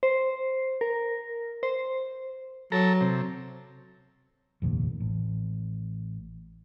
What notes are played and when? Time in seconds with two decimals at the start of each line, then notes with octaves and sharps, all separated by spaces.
0.03 C5
0.81 A#4
1.63 C5
2.72 F#3 A4 A#5
3.01 C3
4.62 F1 A#1 D#2
5.00 A1